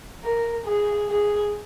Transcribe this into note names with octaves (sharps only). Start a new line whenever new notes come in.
A#4
G#4
G#4